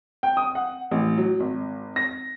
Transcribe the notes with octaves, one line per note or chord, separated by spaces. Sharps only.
G5
D#6
F#5
A1
F#3
G#1
A#6